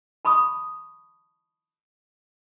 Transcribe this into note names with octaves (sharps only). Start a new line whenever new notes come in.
A5 B5 C#6 D#6